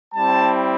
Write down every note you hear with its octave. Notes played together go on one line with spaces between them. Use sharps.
G3 C4 E4 A5